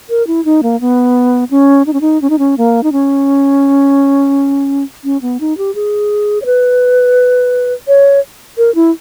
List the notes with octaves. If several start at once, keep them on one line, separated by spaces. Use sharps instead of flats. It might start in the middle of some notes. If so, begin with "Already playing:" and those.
A#4
E4
D#4
A#3
B3
C#4
D#4
C#4
D#4
C#4
D#4
C#4
A#3
D#4
C#4
C#4
B3
D#4
G4
G#4
C#5
B4
C#5
A#4
E4